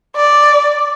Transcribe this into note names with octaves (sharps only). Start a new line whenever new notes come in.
D5